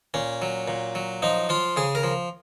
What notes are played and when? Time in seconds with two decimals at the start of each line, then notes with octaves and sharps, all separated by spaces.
0.14 A#2 C#4
0.42 F#3
0.68 A#2
0.95 F#3
1.22 F3 D#4
1.49 F3 F4
1.77 C#3 G#4
1.95 A#4
2.03 F3